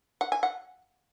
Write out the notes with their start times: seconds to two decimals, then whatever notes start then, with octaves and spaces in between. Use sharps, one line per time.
0.21 F#5
0.32 G#5
0.43 F#5